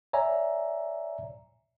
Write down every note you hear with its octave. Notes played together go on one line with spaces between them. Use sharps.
C#5 D5 E5 G#5 A#5